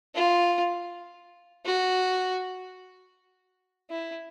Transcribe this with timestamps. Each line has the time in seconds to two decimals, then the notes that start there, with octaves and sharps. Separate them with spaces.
0.15 F4
1.65 F#4
3.90 E4